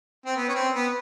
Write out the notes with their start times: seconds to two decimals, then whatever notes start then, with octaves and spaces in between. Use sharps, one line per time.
0.25 C4
0.36 B3
0.48 C#4
0.55 C4
0.74 B3